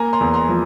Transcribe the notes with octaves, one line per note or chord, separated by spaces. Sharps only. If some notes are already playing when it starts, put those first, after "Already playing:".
Already playing: A#3 G#5 A#5
A#5 C6
E2
A#5 C6
F3